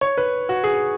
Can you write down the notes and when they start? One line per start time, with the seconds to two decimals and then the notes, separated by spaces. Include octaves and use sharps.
0.01 C#5
0.18 B4
0.49 F#4
0.64 G#4